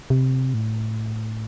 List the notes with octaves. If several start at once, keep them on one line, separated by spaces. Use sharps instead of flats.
C3
A2